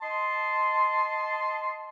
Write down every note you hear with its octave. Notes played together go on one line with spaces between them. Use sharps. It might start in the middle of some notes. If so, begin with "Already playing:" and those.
D#5 A5 C6